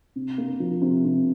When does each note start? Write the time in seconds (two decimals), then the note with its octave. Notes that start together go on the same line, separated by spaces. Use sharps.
0.16 C3
0.38 A#3
0.60 F3
0.82 C3
1.05 C3